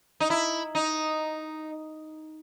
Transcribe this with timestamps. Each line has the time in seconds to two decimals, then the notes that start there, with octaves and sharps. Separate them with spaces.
0.20 D#4
0.30 E4
0.75 D#4